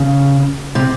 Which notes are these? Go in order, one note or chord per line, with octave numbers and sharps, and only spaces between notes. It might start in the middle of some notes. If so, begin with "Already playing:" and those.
Already playing: C#3
C3